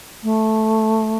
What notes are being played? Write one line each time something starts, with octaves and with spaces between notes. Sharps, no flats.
A3